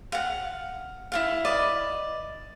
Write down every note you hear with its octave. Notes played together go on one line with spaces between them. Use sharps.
F5 F#5
E4 F4 F5
B4 D5 D#5